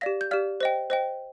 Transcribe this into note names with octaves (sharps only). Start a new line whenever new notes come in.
G4 D5 F5 A#6
G6
G4 D5 F5 F6
C5 D#5 G5
C5 D#5 G5